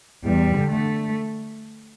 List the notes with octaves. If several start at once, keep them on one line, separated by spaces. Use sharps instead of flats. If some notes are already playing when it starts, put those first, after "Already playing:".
E2 G3
D3
A3